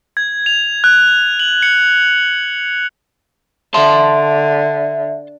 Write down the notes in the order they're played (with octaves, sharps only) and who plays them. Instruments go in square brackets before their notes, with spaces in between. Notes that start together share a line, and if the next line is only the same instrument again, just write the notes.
[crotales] G#6
F7
F#6
F#7
C#7
[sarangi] D3 [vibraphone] E5 [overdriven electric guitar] A5 C6